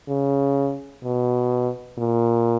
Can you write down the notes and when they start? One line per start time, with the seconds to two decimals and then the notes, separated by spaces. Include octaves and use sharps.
0.08 C#3
1.03 B2
1.98 A#2